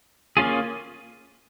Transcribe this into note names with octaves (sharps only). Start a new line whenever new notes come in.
A#3 C#4 F4 G#4